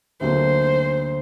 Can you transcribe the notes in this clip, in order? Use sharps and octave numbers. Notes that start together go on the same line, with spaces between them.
D2 D3 F#3 A#3 C5